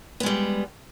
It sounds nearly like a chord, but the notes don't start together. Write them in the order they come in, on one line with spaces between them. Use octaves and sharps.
B3 G#3 G3